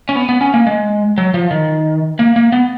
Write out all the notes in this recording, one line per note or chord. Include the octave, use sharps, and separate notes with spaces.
C#4
B3
B3
C#4
A#3
G#3
F#3
F3
D#3
A#3
A#3
B3